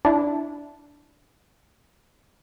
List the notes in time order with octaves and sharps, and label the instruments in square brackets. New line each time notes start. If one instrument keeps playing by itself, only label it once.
[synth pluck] D4 E4